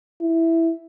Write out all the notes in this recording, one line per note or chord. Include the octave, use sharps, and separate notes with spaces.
E4